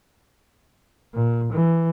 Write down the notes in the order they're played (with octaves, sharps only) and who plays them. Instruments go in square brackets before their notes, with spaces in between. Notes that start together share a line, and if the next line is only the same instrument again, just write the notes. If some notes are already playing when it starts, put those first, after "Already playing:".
[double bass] A#2
E3